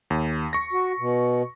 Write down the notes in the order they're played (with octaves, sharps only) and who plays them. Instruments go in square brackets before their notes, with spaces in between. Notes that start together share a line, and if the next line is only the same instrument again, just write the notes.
[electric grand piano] D#2
C#6 A#6
[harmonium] F#4
B2